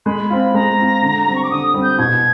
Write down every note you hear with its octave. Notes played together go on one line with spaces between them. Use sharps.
G#3 B5
C4 F4 B5
G#3 A#5
C4 F4
D3
G3 C4
C#6
D6
D3 D#6
D#6
G3 C4
G6
B2 G#6